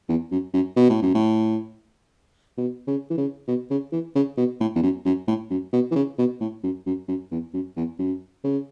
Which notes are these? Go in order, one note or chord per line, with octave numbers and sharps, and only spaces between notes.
E2
F#2
F#2
B2
A2
F#2
A2
B2
C#3
E3
C#3
B2
C#3
E3
C#3
B2
A2
E2
F#2
F#2
A2
F#2
B2
E3
C#3
B2
A2
F#2
F#2
F#2
E2
F#2
E2
F#2
C#3